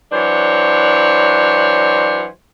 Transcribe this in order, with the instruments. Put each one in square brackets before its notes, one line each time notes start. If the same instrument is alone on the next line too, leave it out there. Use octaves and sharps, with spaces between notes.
[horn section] E3 F#3 D4 C5 C#5